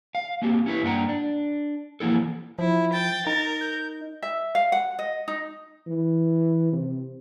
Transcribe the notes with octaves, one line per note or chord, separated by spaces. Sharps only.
F5
A#3 C4 F#4 G4
C#4 E4 B4
G2 A#3 D4 F#5 G5 A#5
D4
E3 F3 A#3 E4 A4
F3 E4
G5 A6
D#4 A#4
G6
E5
F5
F#5
D#5
D#4
E3
C3